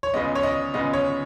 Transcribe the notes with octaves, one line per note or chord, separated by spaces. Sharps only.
C#5
C#2 C#3 G#3 B3 D#5
C#5
D#5
C#2 C#3 G#3 B3 D#5
C#5